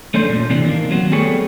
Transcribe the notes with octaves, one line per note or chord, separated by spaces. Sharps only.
A3 C#4 D4 C5
A#2
C3 E3 C4 D4
D#3 A#3
F#3 C4 F#4
G3 A3 B3 G#4 C#5